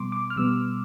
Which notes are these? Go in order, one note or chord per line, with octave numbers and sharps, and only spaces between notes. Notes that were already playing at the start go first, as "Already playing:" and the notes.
Already playing: B2 G3 B3 C6 D6
D6
F6
B2 G3 B3 E6